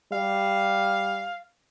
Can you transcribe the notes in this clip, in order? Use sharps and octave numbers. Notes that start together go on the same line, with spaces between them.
G3 F5